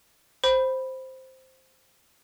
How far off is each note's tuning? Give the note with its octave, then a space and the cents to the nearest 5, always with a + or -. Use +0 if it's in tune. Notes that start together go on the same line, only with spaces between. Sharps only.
C5 +0 B5 +0